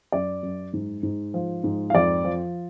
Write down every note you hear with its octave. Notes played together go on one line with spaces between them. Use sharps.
F#2 D5
F#2
G#2
G#2
F3
G#2
F5
F2 D5
F3